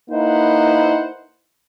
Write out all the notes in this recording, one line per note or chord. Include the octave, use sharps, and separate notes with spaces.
A#3 D#4 E4 B4 C5 F#5